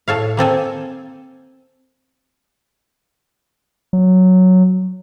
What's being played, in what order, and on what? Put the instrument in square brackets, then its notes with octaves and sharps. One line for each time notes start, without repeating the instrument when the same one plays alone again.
[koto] A2 A4 C#5 F5
A#3 C4 A4 G#5
[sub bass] F#3